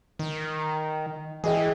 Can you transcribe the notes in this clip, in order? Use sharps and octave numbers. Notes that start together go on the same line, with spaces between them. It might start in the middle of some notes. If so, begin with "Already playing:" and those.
D#3
E3 G#4 D#5 G5